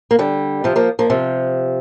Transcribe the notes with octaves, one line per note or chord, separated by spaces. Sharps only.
A#3
D3 G3
C3 F3
F3 A#3
F3 A#3
C3 F3